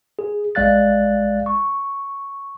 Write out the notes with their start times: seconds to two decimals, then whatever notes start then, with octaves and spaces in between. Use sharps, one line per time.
0.19 G#4
0.55 A1 G#3 D5 F5 F#6 A6
1.46 C#6